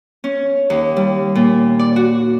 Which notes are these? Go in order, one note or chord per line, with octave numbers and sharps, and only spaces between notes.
C#4
D#2
G3
A#2
D5
F#4